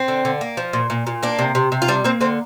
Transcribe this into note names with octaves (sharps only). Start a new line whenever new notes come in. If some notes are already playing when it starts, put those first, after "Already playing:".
Already playing: C4
D3
D3
A#3
F3
A#2
A#2
A#2
A#3 D4
C3
C3
C3
F4
G3 D4
A#3 C4
D3 C4